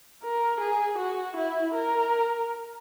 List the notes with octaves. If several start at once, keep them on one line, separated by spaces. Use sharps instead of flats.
A#4
G#4
F#4
E4
A#4